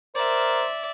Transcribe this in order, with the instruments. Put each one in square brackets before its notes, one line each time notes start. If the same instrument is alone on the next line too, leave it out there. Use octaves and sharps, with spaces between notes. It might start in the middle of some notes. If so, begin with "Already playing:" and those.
[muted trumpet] A#4 [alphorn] C5 [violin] D5 E5